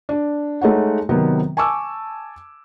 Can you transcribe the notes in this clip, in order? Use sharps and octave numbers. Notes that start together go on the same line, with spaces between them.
D4
G#3 A3 D#4 C#5 F#5
C3 D#3 F#3 B3
G#5 A5 C#6 D6 E6